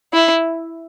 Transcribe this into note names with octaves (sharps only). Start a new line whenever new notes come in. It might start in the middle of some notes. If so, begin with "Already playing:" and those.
E4